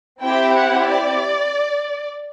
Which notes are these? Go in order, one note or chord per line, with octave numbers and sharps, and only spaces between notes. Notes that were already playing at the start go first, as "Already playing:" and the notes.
C4 E4 G4 G5
F#5
D5